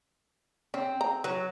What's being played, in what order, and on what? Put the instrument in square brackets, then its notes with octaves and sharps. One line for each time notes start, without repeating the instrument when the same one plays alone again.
[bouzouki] C4 [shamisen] C#4
[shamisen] A#5
[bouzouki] F#3 [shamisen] B4